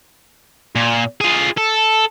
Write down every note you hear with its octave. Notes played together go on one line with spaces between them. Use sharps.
A#2
F4 G#4
A4